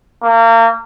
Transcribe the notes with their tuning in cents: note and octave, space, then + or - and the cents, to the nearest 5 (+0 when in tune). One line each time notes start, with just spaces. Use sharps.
A#3 -30